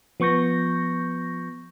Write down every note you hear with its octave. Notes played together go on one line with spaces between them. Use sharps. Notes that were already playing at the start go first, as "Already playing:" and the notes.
F3 B3 C#6 G6 A#6